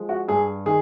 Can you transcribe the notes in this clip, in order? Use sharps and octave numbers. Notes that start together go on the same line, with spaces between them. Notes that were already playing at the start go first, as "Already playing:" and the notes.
Already playing: F3 G#3
F#4
G2 G#4
D#3 G#4